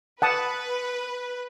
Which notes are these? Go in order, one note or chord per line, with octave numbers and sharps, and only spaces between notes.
B4 F#5 A5 D#6